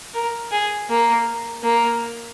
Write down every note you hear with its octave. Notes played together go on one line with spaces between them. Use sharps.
A#4
G#4
A#3
A#3